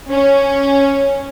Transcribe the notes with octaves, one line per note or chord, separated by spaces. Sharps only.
C#4